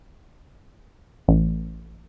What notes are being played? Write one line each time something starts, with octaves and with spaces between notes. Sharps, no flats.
A1